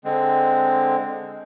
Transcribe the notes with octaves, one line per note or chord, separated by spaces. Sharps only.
D3 G#3 C4